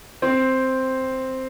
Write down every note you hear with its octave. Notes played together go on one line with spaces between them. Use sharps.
C4